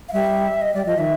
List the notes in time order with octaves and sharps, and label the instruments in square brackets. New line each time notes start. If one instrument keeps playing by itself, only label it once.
[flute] F5
[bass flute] G3 [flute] E5
[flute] D#5
[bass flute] G3 [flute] D5
[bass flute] F3 [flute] D#5
[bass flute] D#3 [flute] E5